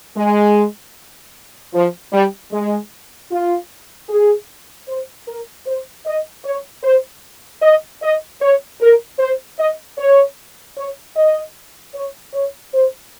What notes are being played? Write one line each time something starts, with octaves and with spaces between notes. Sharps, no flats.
G#3
F3
G3
G#3
F4
G#4
C5
A#4
C5
D#5
C#5
C5
D#5
D#5
C#5
A#4
C5
D#5
C#5
C#5
D#5
C#5
C#5
C5